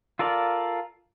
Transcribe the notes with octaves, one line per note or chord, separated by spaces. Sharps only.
F4 A4 A#4 D5 F5